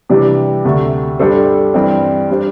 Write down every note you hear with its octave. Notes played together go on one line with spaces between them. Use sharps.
C3 E3 G3 D4 G4
D2 C3 A3
G2 G3 D4 A4 C5
G2 E3 G3 C4
G3 D4 C5